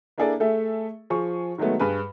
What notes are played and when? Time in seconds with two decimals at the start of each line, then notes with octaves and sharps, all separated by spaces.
0.18 A#3 D4 E4 G#4 A4 D5
0.40 A3 G#4 A4 E5
1.10 F3 G#4 C#6
1.58 D#3 F#3 G#3 A3 B3
1.80 G2 G#4 B4